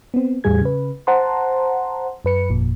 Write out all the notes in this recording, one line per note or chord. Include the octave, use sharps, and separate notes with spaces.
B3 C4
E2 A2 G3 G#4 G#6
C#3 B4
C5 F#5 A5 A#5 C6
F#2 B4 C#7
G1 F2 A#2